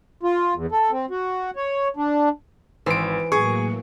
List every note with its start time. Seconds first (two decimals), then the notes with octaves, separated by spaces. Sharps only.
0.23 F4
0.54 E2
0.72 A4
0.91 C4
1.10 F#4
1.56 C#5
1.96 D4
2.86 G#1 E3 C5 D7
3.32 A2 F#3 A#3 G#4 C#6